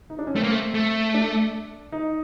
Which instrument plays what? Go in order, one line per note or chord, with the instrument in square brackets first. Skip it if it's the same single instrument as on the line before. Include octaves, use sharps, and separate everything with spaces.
[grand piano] D#4
D4
C#4
[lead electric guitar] A3 [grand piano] C4
[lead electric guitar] A#3
A3
A3
[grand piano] D4
D#4